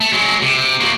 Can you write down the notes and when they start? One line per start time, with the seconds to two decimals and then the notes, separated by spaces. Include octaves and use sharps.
0.01 A3
0.13 F#3 G#3
0.42 C3
0.80 A#3 F#4